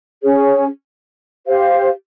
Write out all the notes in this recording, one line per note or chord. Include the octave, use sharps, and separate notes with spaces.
C#4 G#4 C#5
G4 C5 F5